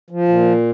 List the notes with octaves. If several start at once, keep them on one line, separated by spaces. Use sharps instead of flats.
F3
A#2